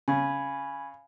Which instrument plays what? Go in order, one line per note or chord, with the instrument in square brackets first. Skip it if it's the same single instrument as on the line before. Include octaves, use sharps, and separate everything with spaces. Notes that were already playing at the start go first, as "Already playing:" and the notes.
[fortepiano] C#3 [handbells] G#5 B5 G#6